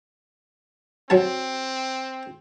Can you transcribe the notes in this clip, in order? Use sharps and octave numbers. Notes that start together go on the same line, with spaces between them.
F#3 C4 A5